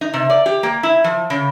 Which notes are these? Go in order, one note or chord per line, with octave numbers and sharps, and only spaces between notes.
D#4
C3
D5
G4
A#3
E4
F3
C#3